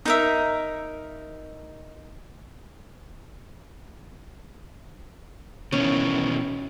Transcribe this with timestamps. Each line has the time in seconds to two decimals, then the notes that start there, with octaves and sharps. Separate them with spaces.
0.05 D#4 A#4 E5
5.72 B2 D#3 E3 C#4